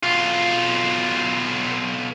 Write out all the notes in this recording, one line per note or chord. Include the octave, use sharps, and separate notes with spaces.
B1 F4